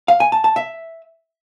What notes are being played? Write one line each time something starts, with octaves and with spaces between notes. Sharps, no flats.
F5
G#5
A5
A5
E5